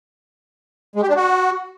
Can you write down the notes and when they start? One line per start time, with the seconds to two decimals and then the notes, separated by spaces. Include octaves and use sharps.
0.96 G#3
1.02 G4
1.09 D4
1.16 F#4